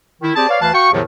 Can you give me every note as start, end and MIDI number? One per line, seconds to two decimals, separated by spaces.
0.22 0.31 51
0.22 0.31 64
0.36 0.46 60
0.36 0.46 67
0.36 0.46 68
0.36 0.46 74
0.36 0.46 81
0.49 0.58 71
0.49 0.58 73
0.49 0.58 74
0.49 0.58 77
0.61 0.70 38
0.61 0.70 52
0.61 0.70 71
0.61 0.70 77
0.61 0.70 81
0.73 0.90 66
0.73 0.90 77
0.73 0.90 79
0.73 0.90 85
0.93 1.02 40
0.93 1.02 45
0.93 1.02 48
0.93 1.02 51
0.93 1.02 53
0.93 1.02 54